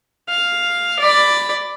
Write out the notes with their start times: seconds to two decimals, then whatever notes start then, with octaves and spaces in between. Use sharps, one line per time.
0.29 F5
0.99 D5 B5